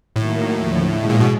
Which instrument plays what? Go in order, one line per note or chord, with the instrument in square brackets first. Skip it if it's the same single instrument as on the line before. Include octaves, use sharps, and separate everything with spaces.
[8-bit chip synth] A2 [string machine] D#3 F#3 A#3 D#4
[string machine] D#2 D3 F3
B2 G#3 C#4 E4
[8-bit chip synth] A#2
B2